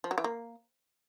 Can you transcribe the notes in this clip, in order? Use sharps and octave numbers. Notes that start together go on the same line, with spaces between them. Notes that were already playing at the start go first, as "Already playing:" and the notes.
F3
F#3
E3
A#3